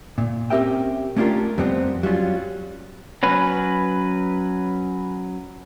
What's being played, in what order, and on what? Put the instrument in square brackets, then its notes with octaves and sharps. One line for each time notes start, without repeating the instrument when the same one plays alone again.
[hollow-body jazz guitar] A#2
C4 C#4 G4 A#4 E5 G5
A3 C#4 D4 F4 G4 A#4
F2 G3 B3 C4
F#3 G3 C#4 F4
[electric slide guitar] F#3 C#4 B4